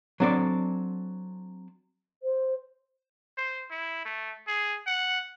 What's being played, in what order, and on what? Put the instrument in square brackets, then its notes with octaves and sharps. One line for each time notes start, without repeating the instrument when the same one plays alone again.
[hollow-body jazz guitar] F#3 C4 D4 A4 D5
[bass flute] C5
[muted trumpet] C5
E4
A3
G#4
F#5